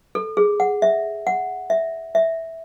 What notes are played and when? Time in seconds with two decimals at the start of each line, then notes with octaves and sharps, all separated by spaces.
0.15 A4
0.37 G#4
0.60 F#5
0.82 E5
1.27 F#5
1.70 E5
2.15 E5